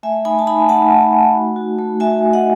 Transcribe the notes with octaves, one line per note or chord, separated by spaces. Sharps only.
A3 E5 G#5
D#4 G#5 B5
A5
D#4 G#5 B5
A3 F#5 A5
D#4
A3
F#4
F#4
A3
F#4 E5 G#5
A3
D#5 F#5